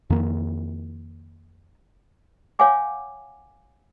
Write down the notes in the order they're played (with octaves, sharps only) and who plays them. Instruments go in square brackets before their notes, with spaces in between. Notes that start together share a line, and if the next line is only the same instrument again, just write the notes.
[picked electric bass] F2 D#3 A#3
[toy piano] C#5 F5 F#5 G#5 D6